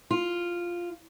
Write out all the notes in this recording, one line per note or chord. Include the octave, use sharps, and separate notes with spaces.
F4